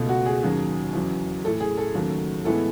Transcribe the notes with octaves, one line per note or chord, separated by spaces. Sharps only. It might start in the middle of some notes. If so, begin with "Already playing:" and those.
Already playing: C#2 B2 A3
F#4
G#4
D#2 C#3 F#3
E2 C#3 F#3
A2 E3 A3 A4
G#4
A4
D#2 C#3 F#3 A3
A2 E3 G#3 B3 A4